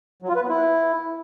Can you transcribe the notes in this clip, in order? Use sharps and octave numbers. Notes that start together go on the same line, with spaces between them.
F#3
F4
B4
B3
E4